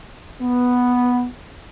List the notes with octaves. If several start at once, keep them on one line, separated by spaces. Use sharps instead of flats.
B3